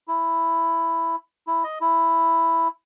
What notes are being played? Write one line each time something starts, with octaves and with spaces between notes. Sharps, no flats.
E4
E4
D#5
E4